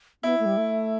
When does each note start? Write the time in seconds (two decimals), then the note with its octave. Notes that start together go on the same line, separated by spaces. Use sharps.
0.23 B3 E4
0.39 A3
0.46 G3
0.57 A3